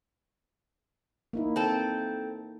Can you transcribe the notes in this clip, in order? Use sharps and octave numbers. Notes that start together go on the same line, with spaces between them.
A#3 D#4 E4
C4 A4